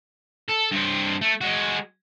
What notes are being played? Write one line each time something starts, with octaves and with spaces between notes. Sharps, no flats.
A4
G2 C4
A3
G#3 F#4